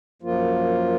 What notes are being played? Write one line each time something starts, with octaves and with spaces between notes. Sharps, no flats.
F#2 F3 A#3 F4